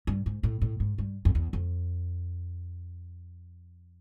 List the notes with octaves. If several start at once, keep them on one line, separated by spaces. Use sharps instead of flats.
G2
G#2
A2
A2
G#2
G2
F2
E2
F2